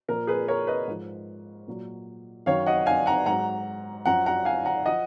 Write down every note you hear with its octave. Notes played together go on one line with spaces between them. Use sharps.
A#2 F3 A#4
G#4 B4
A#4 C#5
B4 D#5
G#2 F3
A#2 F#3
F#2 D#3 F#3 C#5 F5
D#5 F#5
F5 G#5
F#5 A#5
G#2 F#3 F#5 A#5
F#2 F3 F#5 A#5
F#5 A#5
F5 G#5
F#5 A#5
F3 D#5 F#5